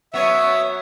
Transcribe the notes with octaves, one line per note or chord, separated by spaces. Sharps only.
F#3 B3 C#5 E5